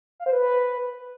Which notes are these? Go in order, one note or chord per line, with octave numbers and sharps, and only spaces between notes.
F5
C5
B4